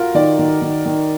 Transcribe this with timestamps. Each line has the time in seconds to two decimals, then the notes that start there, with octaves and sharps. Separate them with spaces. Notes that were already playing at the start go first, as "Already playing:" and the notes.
Already playing: F4 F#4 A#4
0.15 D#3 D5
0.39 D#3
0.62 D#3
0.86 D#3